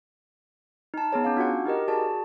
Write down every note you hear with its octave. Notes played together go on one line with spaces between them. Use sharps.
D#4 A5
B3 D#4 G#4 C#5
C#4 F5
D4 F4 F#4 F#5
D#4 G4 A#4 D#5
F#4 G#4 D5 A5